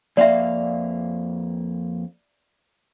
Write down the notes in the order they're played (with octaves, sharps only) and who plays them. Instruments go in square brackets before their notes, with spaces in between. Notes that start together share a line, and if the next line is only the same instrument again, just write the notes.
[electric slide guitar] F2 A#3 F5 [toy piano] D5 E5